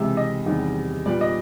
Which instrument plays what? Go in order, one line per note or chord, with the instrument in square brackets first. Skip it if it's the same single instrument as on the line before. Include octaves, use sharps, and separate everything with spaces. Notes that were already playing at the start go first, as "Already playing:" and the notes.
Already playing: [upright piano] C#2 C3 E3 E5
D#5
E2 C3 D#3 G3
A#2 G3 B3 D5
D#5